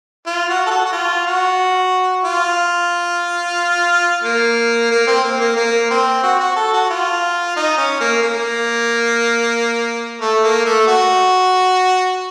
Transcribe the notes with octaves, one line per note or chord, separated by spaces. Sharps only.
F4
F#4
A4
F#4
F#4
F4
F#4
F4
A#3
A#3
C4
A#3
A#3
A#3
C4
F#4
F#4
A4
F#4
F4
D#4
C#4
A#3
A#3
A3
A#3
A3
F#4